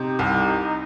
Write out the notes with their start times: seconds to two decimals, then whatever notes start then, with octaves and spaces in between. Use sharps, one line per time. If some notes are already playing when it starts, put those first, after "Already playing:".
Already playing: C3 D#4
0.19 C2